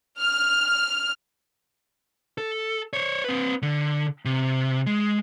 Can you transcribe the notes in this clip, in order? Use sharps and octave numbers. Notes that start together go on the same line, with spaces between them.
F6
A4
C5 C#5
C4 B4
D3
C3
G#3